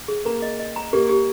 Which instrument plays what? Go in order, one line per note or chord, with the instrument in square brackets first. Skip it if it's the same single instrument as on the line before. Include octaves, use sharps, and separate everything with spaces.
[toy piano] G#4
[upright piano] A#3 [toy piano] A#5
[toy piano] D#5
D#5
A#5
[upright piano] A#3 [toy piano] G4
[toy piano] G4